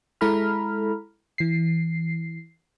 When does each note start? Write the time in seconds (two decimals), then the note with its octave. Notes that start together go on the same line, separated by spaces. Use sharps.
0.21 G#3 E4 A4 A#5 B5 F6
1.38 E3 C7